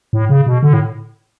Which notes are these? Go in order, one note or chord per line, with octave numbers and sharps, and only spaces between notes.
A2
C#3
B2
D3
A2